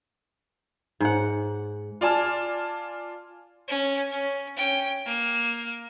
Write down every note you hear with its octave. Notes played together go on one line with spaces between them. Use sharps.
G#2 F#5
F4 D5 G#5 A5 F6
C#4
C#4
C#4 G5
A#3